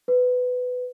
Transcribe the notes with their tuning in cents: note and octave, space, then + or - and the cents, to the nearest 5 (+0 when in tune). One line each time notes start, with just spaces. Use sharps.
B4 +15